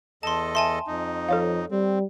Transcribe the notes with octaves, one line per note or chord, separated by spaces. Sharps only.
E2 A4 D#5 A5 C6
E5 G#5 A5 C6
F2 D#4
F3 A4 C#5 F5
G3 C4